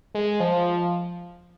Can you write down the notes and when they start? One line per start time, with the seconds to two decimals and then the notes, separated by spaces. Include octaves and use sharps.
0.15 G#3
0.40 F3